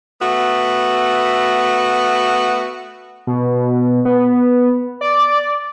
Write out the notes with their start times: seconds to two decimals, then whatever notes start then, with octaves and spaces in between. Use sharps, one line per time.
0.21 A3 B3 F#4
3.27 B2
4.05 B3
5.01 D5